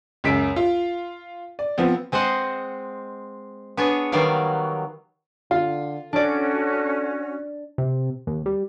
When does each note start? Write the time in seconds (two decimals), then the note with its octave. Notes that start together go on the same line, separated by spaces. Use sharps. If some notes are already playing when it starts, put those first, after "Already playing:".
0.24 C#2 F#2 B6 D7
0.56 F4
1.59 D5
1.78 F3 B3 C4
2.12 G#3 C4 C5 D#5 F#5
3.77 B3 D4 G#4 C#5
4.12 D#3 F#3 G3 B3 D5 F5
5.51 D3 F4 F5
6.13 C#4 D4 F#4 A4 D5
7.78 C3
8.27 D#2
8.46 G3